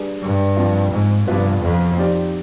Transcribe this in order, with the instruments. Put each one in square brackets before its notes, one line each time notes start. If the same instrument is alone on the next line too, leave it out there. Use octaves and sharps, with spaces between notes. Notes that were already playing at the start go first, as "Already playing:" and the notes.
Already playing: [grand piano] G3 D4 G#4 B4 D5
[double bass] G2
[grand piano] F3 C4 F4
[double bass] G#2
[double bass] G2 [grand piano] C3 F3 B3 F4 B4
[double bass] F2
[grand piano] C4 D#4 G4 D5